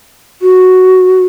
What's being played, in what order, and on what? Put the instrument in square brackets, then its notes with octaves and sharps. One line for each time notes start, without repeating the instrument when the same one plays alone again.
[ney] F#4